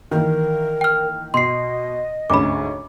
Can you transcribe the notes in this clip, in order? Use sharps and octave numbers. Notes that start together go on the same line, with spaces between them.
D#3 E3 A#3 A#4
G5 F6
B2 D#5 C6 C7
D2 G#2 C#4 B5 D6